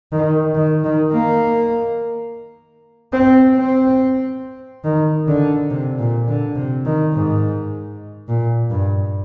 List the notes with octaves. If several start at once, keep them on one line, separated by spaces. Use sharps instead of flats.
D#3
D#3
D#3
A#3
C4
C4
D#3
D3
C3
A#2
D3
C3
D#3
G#2
A#2
G2